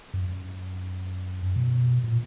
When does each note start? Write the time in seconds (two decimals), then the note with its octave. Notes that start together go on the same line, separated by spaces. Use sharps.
0.14 F#2
1.56 B2
2.04 A#2